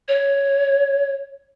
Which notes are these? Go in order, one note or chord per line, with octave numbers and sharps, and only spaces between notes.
C#5